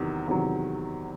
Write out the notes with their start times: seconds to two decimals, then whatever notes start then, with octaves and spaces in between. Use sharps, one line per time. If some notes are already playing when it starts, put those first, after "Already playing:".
Already playing: E2 C3 D#3 F#3
0.28 E2 C3 D#3 F#3